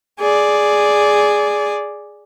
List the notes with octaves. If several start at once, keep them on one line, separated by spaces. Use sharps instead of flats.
G#4 D5